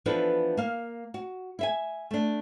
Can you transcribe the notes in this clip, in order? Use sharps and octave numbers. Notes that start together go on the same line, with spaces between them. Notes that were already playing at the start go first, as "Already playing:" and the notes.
E3 F3 B3 D4 A4 B4
A#3 F5
F#4
E4 E5 G#5
A3 D4